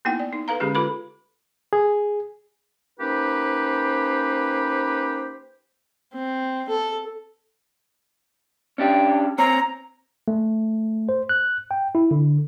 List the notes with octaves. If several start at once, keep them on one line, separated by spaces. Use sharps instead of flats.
A#3 B3 D#4 E4 F#5 G5
D5
D#4
A4 B4 F5 A#5
D3 G#3 C#4 G4 G#4
F4 A4 B4 B5
G#4
A#3 C#4 D#4 G4 B4 C5
C4
A4
C#4 D4 G4
C4 C#5 A#5
A3
C5
F#6
G5
E4
D3